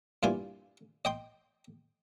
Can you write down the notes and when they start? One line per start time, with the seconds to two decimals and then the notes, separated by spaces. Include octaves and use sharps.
0.23 G2 A#2 E4 F4 G#5
1.05 D#5 G5 C6